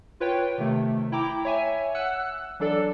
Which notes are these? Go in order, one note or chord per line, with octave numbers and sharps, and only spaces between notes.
F4 B4 C#5 G5
C3 D#3 A3
E4 G5 A#5 D6
C#5 E5 G#5
F#5 E6 F#6
E3 F#3 D4 A4 D5